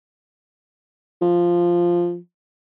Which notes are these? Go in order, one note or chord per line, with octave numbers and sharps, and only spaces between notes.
F3